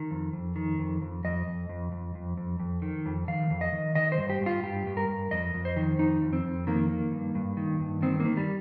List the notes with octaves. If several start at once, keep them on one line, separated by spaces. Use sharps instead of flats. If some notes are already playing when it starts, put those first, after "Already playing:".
Already playing: D#3
F2
F2
D#3
F2
F2
F2 D#5
F2
F2
F2
F2
F2
F2
D#3
F2
D#3 F5
F2
D#5
D#3
D#3 D#5
C5
G2
G4
G2
F4
G2 G4
G2
A#4
G2
F2 D#5
F2
C5
D#3
F2 D#4
F2
C4
F2
D#3 A#3
D#3
G2
G2
D#3
G2
D#3 C4
A#3
D#3
G3